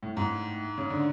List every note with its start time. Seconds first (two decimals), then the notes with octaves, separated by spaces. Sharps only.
0.03 A2
0.17 G#2
0.78 C#3
0.90 D3